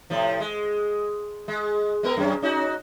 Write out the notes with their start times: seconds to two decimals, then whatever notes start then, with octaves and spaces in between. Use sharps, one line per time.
0.10 A2 C3 F3
0.40 G#3
1.48 G#3
2.03 G#3 B3 A#4
2.17 F#2 C#4
2.42 C#4 D#4 F#4